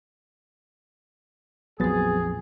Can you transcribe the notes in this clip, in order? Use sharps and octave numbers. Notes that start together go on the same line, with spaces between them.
A#1 F2 F#3 B3 G#4 A6